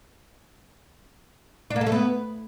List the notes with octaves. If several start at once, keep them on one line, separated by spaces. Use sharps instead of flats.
D4
A#3
A4
A3
B3